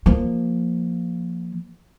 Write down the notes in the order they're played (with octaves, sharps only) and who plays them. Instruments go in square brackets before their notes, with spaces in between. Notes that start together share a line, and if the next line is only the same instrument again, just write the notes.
[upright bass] F3 A#3